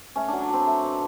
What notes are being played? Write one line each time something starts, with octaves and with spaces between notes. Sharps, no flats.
A3 C#4
F#3 D4
D4
F#3 C4
A3
B2